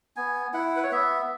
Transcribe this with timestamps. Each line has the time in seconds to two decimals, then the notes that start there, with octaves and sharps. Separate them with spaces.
0.16 B3 G#5
0.54 E4 F#5
0.76 B4
0.83 C#5
0.92 B3 E5